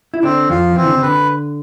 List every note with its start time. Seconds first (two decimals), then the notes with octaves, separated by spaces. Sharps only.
0.14 E4
0.23 D3 C4 D4
0.49 F2 F3 F4
0.76 E3 C4
0.86 D3
0.95 C3
1.02 D3 B4